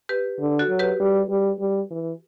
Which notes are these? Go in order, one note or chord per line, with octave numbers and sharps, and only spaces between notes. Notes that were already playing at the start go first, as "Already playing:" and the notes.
G4 B4
D3
F#4 A4
F#3
G4 B4
G3
G3
G3
E3